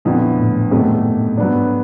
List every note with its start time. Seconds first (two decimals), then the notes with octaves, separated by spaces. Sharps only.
0.05 F2 A#2 D3 F#3 B3 E4
0.38 A2
0.71 E2 G2 C3 D#3 F#3 A3
1.37 G#2 F#3 B3 D4